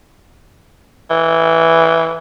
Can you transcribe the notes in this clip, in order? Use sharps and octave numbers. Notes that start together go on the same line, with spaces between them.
E3